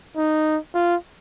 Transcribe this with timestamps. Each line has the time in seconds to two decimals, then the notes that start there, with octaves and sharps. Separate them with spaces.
0.17 D#4
0.74 F4